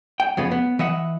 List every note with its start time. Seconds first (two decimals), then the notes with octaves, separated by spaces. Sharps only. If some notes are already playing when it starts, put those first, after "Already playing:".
0.20 G5
0.37 F2 C#3 G#3 B3
0.51 B3
0.79 E3 D#5 E5 F#5